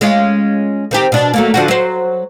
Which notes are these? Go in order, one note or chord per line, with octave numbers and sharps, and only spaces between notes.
G#3 C#4 F4
D#3 C4 G4
B2 D4
F#3 A3 A#3
D3 F3 F#4
F#3 C5